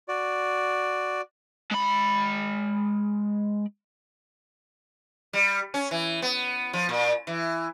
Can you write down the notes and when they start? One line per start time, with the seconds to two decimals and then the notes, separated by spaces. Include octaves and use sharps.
0.08 F#4 D5
1.71 G#3 B5
5.33 G3
5.74 C#4
5.91 E3
6.22 B3
6.73 F3
6.89 A#2
7.27 E3